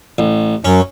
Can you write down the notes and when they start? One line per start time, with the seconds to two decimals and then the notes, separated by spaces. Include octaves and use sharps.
0.18 A1
0.65 F#2 C#4